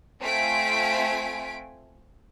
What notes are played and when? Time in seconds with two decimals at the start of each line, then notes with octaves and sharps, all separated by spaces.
0.21 A3 C4 F4 G#5 B6 D7